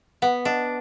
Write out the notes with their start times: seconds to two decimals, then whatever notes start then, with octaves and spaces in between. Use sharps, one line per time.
0.22 B3 F#5
0.45 D4 D#5